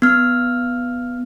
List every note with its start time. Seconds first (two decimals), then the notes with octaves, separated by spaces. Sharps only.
0.02 B3 F6